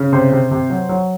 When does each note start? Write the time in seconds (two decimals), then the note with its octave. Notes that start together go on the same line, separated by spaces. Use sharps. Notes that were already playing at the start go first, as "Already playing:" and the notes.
Already playing: C#3
0.12 C3 C5
0.32 C3
0.51 C3
0.70 F#3
0.89 F#3